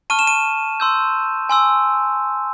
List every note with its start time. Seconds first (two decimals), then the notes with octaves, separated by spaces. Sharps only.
0.10 A5 C#6 F6 D#7
0.19 E7
0.27 D#7
0.80 C6 E6 G6
1.49 G#5 C6 E6